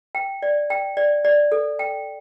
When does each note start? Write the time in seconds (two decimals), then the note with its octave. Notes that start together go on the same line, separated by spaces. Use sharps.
0.15 G5
0.43 D5
0.70 G5
0.97 D5
1.25 D5
1.52 A4
1.79 G5